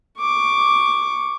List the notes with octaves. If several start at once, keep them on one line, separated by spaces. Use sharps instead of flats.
C#6 D6